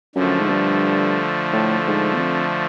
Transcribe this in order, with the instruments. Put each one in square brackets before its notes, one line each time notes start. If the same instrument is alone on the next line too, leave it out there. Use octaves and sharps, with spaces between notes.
[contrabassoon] F#2 [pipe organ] D3 F3 A3
[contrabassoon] G#2
G2
A2
G#2
E2
F2